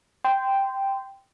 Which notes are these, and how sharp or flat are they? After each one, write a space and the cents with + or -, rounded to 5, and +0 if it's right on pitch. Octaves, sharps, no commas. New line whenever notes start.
G5 +0 C6 -25